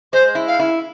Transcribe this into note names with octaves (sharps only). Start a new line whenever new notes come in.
G#3 C5
E4
F5
E4